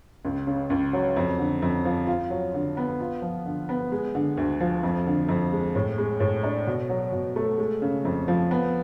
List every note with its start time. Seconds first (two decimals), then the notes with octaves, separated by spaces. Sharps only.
0.25 C#2
0.47 C#3
0.70 C#2
0.93 F#3
1.16 F2
1.39 D3
1.62 F2
1.85 F3
2.07 F4
2.30 F#3
2.54 D3
2.77 B3
3.00 F4
3.22 F3
3.46 D3
3.69 B3
3.92 G#3
4.15 D3
4.37 D2
4.60 F3
4.83 F2
5.07 D3
5.28 F2
5.52 G#3
5.75 A2
5.98 G#3
6.20 A2
6.43 D4
6.67 B2
6.90 F#3
7.12 B2
7.36 A3
7.58 G#3
7.82 C#3
8.05 F2
8.28 F3
8.51 B3